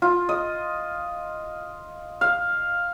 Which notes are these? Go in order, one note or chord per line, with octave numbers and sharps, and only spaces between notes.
F4
D#5
F5